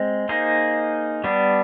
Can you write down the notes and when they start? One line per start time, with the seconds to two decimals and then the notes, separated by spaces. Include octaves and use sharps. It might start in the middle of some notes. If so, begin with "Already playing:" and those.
Already playing: G#3 C4
0.29 A#3 D#4 G#4 C5
1.24 G3 B3 D4